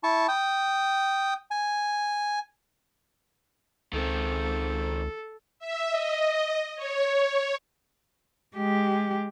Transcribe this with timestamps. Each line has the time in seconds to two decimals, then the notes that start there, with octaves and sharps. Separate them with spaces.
0.04 E4 A5 C#6
0.28 G5 D#6
1.51 G#5
3.93 C#2 D#3 C4 A4
5.59 E5
5.90 D#5
6.76 C#5
8.56 G#3 G4